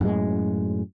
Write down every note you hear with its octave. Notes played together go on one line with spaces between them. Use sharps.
F#2 A2 G#3